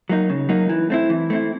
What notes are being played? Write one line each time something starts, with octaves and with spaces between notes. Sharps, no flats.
F#3 A#3 D#4
C#3
F#3 A#3 D#4
E3
A3 C4 E4
E3
A3 C4 E4